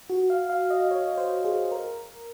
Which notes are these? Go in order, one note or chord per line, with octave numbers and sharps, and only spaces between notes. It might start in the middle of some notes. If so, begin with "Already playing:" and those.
F#4
F5
F5
D#5
C#5
C5
G#4
A#4